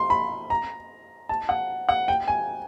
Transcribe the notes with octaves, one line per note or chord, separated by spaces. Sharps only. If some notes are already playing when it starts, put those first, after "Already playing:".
Already playing: C6
B5
A#5
A5
F#5
F#5
G5
G#5